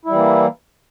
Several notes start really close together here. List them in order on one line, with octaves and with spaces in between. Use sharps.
E4 G3 E3 A#3